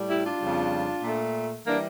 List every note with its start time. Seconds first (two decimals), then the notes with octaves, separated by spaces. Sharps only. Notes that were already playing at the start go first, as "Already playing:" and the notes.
Already playing: A2 G3
0.09 E4 G4
0.24 D4 F4
0.40 F2 C#3 G3
1.03 A#2 A3
1.66 E3 G3 A#3 D4